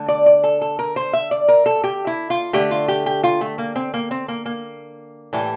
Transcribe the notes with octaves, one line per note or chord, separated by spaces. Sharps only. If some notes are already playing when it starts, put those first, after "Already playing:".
Already playing: D3 A3
D5
D5
A4
A4
A#4
C5
E5
D5
A#4
A4
G4
E4
F4
D3 A3 G4
F4
G4
G4
F4
A3
A#3
C4
A#3
C4
A#3
A#3
A2 E3 G3